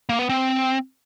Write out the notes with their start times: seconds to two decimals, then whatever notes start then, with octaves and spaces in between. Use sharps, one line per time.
0.09 A#3
0.19 B3
0.29 C4